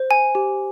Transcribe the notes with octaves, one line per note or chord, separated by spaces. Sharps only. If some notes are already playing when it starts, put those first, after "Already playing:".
Already playing: C5
G#5
G4